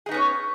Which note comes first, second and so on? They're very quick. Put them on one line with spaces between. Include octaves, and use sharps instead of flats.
G#4 D#4 B3 C#4 C#5